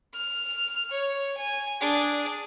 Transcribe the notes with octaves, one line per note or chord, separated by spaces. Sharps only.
F6
C#5
G#5
D4 G#4